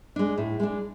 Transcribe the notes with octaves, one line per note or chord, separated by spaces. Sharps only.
G#3 D4
A2
G#3 D4